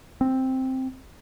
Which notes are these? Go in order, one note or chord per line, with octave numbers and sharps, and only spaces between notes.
C4